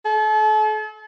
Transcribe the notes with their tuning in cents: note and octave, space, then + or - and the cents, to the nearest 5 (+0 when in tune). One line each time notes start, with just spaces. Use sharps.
A4 -40